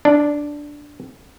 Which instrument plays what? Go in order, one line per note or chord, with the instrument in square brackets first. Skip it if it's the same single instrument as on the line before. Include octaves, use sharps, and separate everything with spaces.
[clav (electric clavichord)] D4